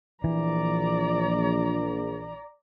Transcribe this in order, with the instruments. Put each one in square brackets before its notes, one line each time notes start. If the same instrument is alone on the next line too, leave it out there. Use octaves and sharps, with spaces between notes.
[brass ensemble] A#1 [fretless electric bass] E3 [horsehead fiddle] D5 A#5